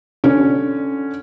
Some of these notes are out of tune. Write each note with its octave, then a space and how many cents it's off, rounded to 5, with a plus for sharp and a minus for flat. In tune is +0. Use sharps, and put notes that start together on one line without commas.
D3 +0 C#4 -5